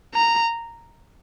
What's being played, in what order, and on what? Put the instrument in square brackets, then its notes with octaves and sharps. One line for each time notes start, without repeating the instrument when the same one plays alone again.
[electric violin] A#5